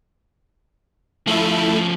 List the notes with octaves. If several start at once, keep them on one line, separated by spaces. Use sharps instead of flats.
F3 A3 C#4 E4 A4